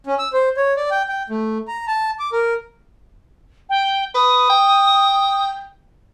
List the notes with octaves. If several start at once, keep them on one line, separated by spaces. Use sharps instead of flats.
C#4
E6
C5
C#5
D5
G5
G5
A3
A#5
A5
D6
A#4
G5
B4 D#6
G5